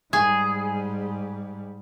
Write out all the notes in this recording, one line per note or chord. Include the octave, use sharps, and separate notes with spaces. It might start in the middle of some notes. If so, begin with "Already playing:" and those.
G#2 G3 G#4